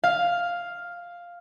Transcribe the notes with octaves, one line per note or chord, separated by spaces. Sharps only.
F5